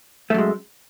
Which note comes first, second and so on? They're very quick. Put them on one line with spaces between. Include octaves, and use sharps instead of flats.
A3 F#2 G#3